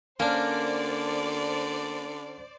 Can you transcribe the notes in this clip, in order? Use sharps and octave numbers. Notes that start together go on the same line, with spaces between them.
D3 A#3 C#4 D4 C5 D5